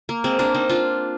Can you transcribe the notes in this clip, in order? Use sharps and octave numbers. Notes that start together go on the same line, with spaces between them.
A#3
G#3 C4
A#3 D4
C4 D#4
D4 F4